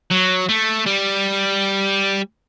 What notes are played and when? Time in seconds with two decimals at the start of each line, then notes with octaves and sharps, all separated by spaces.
0.11 F#3
0.49 A3
0.86 G3